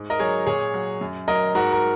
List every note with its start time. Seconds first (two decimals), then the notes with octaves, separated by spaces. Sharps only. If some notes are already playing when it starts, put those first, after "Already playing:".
Already playing: G#2
0.10 A#4 D#5
0.20 F#3 G#4 C#5
0.46 A#2 G#4 C#5
0.74 F#3
1.01 F#2
1.28 F#3 A#4 D#5
1.55 G#2 F#4 A#4
1.73 A#4